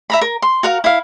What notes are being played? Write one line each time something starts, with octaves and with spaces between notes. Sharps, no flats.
E5 A#5 B5
A#4
C6
F#4 A#4 F5
E4 F5